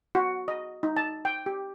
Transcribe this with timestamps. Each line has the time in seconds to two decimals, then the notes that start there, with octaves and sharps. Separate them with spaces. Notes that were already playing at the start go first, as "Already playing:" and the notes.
0.15 F#4
0.48 D#5
0.83 D#4
0.97 A5
1.25 G5
1.46 G4